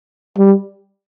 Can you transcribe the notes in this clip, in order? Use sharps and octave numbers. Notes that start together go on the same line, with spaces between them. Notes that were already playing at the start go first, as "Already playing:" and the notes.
G3